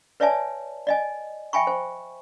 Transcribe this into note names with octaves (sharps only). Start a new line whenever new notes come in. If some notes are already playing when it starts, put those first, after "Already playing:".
B4 C#5 D5 E5 G#5 A5
D5 D#5 G#5
E5 G5 G#5 B5 C#6
C5